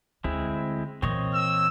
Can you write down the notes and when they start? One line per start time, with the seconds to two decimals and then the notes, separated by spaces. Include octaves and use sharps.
0.24 D2 G#3 C4 E4
1.02 A#2 E3 C4 C#5 D#5
1.34 E6